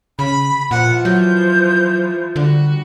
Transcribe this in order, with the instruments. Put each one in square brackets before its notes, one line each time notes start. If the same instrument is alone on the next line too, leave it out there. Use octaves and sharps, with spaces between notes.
[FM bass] C#3 [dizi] B5
[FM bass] A#2 [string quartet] E3 F3 [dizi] F#5
[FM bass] F#3 [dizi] G6
[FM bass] D3 [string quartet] G3 F#4